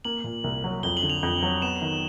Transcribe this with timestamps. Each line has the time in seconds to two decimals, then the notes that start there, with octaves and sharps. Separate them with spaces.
0.05 A#3 F#7
0.24 A#2
0.44 C2
0.64 F#3
0.83 F2 G7
0.97 F#7
1.03 D3
1.10 F7
1.23 F2
1.42 F#3
1.62 B3 E7
1.82 D#3